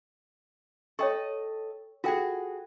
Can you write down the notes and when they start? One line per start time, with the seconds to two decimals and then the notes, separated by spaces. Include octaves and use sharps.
0.99 A4 C#5 D#5 G5 C#6
2.04 F4 F#4 G#4 A4 G5